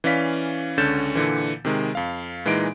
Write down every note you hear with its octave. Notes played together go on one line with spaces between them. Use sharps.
E3 C#4 D5 F5 B6
C#2 D3 C#4 G6 A6 E7
A#2 D3 E3
C3 D#3 G#3
F2 F5
A#2 E3 G#3 D#4 D7